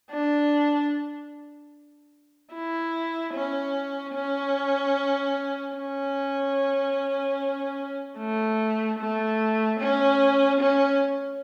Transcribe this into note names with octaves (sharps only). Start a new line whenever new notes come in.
D4
E4
C#4
C#4
C#4
A3
A3
C#4
C#4